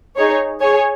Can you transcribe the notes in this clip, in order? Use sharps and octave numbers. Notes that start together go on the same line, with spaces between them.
D#4 G#4 C#5
G#4 C#5 G#5